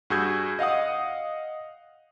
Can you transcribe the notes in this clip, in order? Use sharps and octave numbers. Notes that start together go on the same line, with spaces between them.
G2 F#4 G#4 E6 G6 G#6
D#5 F5 F#5 D#6